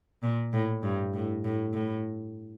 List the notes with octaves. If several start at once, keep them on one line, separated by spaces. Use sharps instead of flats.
A#2
A2
G2
A2
A2
A2